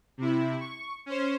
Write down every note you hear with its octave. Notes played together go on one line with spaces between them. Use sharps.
C3 E4
C#6
C#4 C5